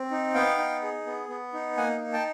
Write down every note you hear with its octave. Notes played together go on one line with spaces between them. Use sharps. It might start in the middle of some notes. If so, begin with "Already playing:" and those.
Already playing: C4
D#4
B3 F5 G5
D#4
G#4
B3
B3
D#4
A#3 F#5 G#5
D#4
G5 A5